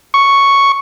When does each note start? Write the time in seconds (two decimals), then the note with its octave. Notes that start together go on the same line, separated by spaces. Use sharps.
0.14 C#6